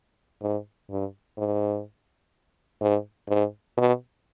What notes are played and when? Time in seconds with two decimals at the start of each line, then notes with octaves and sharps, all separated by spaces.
0.41 G#2
0.90 G2
1.37 G#2
2.81 G#2
3.29 G#2
3.77 B2